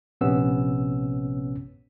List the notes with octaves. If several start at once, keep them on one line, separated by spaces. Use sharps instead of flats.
A#1 C3 B3 C#4 E6